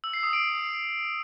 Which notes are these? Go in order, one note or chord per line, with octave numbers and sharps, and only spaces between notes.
E6
C7
D#6
D7